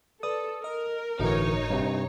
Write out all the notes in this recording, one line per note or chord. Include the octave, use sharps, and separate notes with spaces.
A4 B4 D5 D#6
A#4 D#5
G1 A2 D3 E3 D#4 F#4 C#5
G2 C3